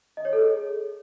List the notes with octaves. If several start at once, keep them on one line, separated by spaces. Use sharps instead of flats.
D#5
C#5
A4
G#4